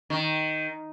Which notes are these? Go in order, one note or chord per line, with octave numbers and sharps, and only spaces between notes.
D#3